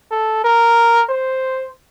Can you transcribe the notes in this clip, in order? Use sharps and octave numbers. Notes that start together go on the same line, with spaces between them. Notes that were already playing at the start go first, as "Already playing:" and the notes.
A4
A#4
C5